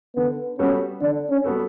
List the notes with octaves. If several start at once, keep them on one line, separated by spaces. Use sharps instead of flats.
D3 B3
G3 B3 C#4 F#4 A4
D3 D4
C#4
G3 B3 F#4 A4